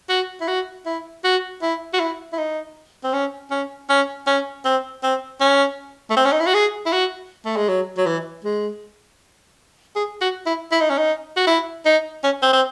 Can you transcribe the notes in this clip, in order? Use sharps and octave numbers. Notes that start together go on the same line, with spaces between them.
F#4
E4
F#4
E4
F#4
E4
F#4
E4
E4
D#4
C4
C#4
C#4
C#4
C#4
C4
C4
C#4
A3
C4
C#4
D#4
E4
F#4
G#4
E4
F#4
A3
G#3
F#3
F#3
E3
G#3
G#4
F#4
E4
E4
D#4
C#4
D#4
F#4
E4
D#4
C#4
C4
C4